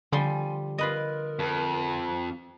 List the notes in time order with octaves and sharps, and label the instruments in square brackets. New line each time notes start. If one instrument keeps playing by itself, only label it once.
[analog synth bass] D3 [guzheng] F3 G3 C6 [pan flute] G#5
[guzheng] F4 B4 D#5 [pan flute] A#4
[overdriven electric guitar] F2